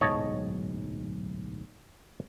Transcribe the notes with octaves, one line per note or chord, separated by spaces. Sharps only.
D1 B1 G#2 C#5 D#5 A5